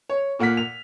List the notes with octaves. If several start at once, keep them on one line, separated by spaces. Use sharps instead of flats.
C#5
A#2 A#3 F#5 F6 B6
F7